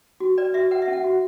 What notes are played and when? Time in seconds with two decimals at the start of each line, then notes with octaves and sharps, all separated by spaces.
0.20 F#4
0.38 B4 D5
0.54 F#4 E5
0.71 B4 F#5
0.82 E5
0.88 C#4
0.93 F#5
1.04 F#4